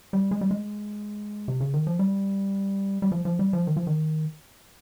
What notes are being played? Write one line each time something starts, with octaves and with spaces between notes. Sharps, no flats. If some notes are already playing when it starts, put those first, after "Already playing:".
G3
G#3
G3
G#3
C3
C#3
D#3
F3
G3
G3
F3
F3
G3
F3
D#3
F3
D#3